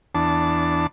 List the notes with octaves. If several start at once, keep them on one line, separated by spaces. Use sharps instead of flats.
E2 D4 A5